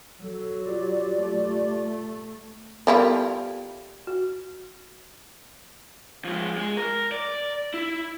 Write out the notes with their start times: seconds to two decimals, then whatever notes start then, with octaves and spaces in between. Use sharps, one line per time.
0.23 F#3 A4
0.66 F4 G4 D5
1.22 A3
2.87 G3 B3 E4 F4 A4 A#4
4.07 F#4
6.25 F3 G#3
6.58 G#3
6.77 A#4
7.12 D5
7.74 E4